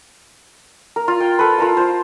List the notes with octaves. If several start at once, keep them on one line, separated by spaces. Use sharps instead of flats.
A#4
F4
G5
A4 B4
F4 A#4 A5
F4 C5